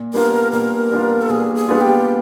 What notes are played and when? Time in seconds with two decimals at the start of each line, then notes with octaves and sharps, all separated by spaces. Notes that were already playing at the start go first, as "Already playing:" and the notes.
Already playing: A#2
0.14 G3 B3 D4 F4 A#4
0.52 A#2 A#4
0.91 G3 B3 D4 F4
1.21 A4
1.30 A#2 G#4
1.55 G#4
1.69 G3 B3 D4 F4
1.81 G4